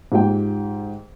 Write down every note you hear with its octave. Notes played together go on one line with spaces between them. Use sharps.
G#2 F4 G4 G5